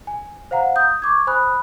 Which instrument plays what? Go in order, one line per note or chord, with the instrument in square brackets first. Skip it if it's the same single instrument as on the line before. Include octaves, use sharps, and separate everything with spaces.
[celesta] G#5
C5 F5 F#5 A#5
D#6 G6
C#6 D6 G#6
C5 G#5 B5 D#6 F#6